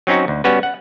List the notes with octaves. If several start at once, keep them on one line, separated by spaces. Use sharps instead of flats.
F#3 C4 C#4 D#4 F#4
D2
G3 B3 C#4 F#4 B4
F#5